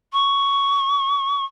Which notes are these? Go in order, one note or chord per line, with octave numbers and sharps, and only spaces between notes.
C#6